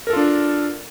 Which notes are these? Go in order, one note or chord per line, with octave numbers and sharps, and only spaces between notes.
D4 F4 A4 A#4